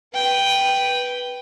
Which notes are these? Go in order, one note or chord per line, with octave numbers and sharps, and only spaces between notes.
B4 G5